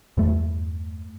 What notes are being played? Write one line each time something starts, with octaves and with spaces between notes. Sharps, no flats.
E2 G2 A3